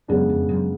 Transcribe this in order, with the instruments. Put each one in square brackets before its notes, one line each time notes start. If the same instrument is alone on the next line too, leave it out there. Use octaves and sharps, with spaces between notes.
[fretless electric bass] F#2 [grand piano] C#3 G#3 B3 D4
[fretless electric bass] F2
F#2